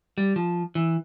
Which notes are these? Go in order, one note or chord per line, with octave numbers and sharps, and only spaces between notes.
G3
F3
E3